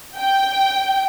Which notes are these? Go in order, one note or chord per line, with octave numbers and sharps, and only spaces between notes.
G5